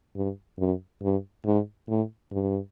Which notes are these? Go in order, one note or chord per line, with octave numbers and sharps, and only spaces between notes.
G2
F#2
G2
G#2
A2
G2